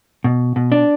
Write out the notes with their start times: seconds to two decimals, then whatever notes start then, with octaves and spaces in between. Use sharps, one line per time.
0.24 B2
0.56 B2
0.72 D4